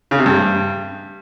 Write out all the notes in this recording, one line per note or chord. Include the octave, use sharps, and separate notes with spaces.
C#3
C3
G2